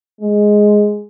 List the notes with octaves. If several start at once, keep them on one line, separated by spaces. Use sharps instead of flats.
G#3